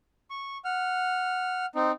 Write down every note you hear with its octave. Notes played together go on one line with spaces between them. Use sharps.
C#6
F#5 F6
C4 D#4